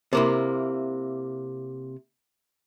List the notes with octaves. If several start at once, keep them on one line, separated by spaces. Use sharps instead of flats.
C3 A#3 E4